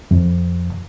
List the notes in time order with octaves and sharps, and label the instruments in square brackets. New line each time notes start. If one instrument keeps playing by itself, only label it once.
[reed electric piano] F2